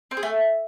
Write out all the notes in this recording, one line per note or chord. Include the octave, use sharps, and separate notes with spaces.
C4
G#4
A3